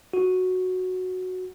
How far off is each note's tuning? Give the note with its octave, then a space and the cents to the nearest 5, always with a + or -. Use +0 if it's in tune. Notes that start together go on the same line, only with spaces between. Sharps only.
F#4 -5